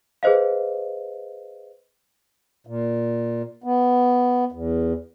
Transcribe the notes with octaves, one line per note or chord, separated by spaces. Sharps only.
G#4 B4 C5 D#5 F5
A#2
B3
E2